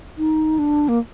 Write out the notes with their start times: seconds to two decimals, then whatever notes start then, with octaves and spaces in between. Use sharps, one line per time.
0.18 D#4
0.59 D4
0.89 A#3